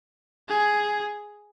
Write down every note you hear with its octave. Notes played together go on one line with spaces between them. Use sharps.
G#4